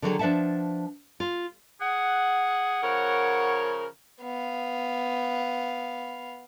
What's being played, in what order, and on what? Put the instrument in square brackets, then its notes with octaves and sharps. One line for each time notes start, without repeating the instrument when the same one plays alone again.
[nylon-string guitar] D3 D#3 F#3 D#4 F#4 G#4
F3 D4 B4 E5 F#5 A5
F4
[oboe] G#4 [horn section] F#5
[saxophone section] C#3 F3 A#4 [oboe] C#5
[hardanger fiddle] B3 F5